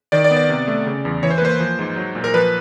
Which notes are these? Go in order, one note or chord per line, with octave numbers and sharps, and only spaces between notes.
D#3 D5
D5
B3
D5
C3
A3
C#3
E2
E3 C#5
C5
B4
A#3 C5
F3
G#2
F#3
A#2
A#4
F3 B4